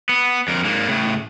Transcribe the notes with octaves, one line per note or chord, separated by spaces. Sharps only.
B3
F2 A#4
G#2 A#3
A2 C#3